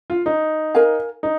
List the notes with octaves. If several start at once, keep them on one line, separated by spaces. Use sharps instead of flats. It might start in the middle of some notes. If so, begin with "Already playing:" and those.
F4
D#4
A#4 F5 G#5
D#4